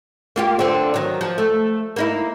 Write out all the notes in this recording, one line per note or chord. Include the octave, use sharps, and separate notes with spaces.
A#3 F4 G4
D3 C4
D#3 F#3
F3
A3
A#3 D#4 E4